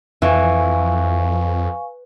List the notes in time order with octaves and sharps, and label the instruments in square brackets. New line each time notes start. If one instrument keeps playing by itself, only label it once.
[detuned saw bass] F2 [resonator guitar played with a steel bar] E3 [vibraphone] F5 G#5 C#6